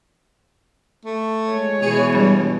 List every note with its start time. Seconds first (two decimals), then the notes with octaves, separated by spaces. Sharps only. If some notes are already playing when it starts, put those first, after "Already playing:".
1.05 A3
1.50 G#3 C#5
1.82 B2 E3 G#4
2.15 G2 G3